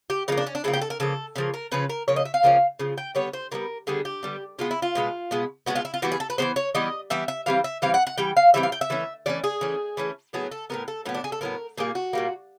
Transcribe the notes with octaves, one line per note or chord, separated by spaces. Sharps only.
G4
C#3 F3 A#3 D#4
D4
C#4
D4
C#3 F3 A#3 E4
G4
A4
A#4
C#3 F3 A#3 A4
C#3 F3 A#3 A#4
A#4
C#3 F3 C#4 B4
A#4
C#3 F3 A#3 C#5
D#5
E5
F5
C#3 F3 A#3 C#4
C#3 F3
G5
D3 G3 B3 C#5
C5
D3 G3 B3 A#4
D3 G3 B3 G#4
G4
D3 G3 B3
B2 G#3 B3 F4
E4
F4
B2 G#3 B3
B2 G#3 B3
B2 G#3 B3 F#4
F4
E4
F4
E3 G3 B3 F#4
G#4
A4
B4
E3 G3 B3 C5
C#5
E3 G3 B3 D#5
E3 G3 B3 E5
E5
E3 G3 C4 F5
E5
E3 G3 C4 F5
F#5
F#5
E3 G3 G5
F5
E3 G3 C4 E5
F5
G5
E5
E3 A3 C#4
E3 A3 C#4 D5
G#4
E3 A3 C#4
E3 A3 C#4
A2 F#3 B3 G#4
A4
A2 F#3 B3 A#4
A4
A2 F#3 B3 D#4
D4
G#4
A4
A2 F#3 B3 A#4
A#2 G3 A#3 G#4
F#4
A#2 G3 A#3